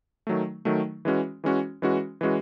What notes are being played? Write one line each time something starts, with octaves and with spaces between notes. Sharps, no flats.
D#3 F#3 A3
D#3 F#3 A3
E3 G#3 C#4 F#4
E3 G#3 C#4 F#4
E3 G#3 C#4 F#4
E3 G#3 C#4 F#4